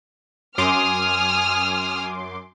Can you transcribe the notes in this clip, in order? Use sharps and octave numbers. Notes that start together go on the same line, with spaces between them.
F#2 G#5 C6 D6 D#6 F6